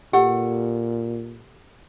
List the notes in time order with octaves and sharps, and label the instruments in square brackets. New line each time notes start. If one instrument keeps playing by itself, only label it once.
[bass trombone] A#2 [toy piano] G4 [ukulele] A4 F#5